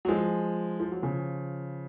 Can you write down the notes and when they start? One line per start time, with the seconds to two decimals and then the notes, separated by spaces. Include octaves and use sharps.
0.05 F#3
0.08 F3 G#3
0.80 F3
0.92 F#3
1.02 C#3 F3